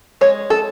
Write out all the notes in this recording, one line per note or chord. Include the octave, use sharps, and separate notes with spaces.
G#3 C#5
A4